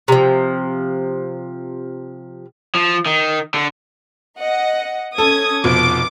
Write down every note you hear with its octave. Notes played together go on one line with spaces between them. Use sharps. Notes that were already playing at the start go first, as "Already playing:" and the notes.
C3 F3
F3
D#3
D3
D#5 F#5
C#4 A4 D#6 G#6
F1 B2 F3 D6